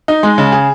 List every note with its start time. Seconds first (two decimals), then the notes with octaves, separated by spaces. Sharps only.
0.08 D#4
0.23 G#3
0.38 C#3
0.52 G#4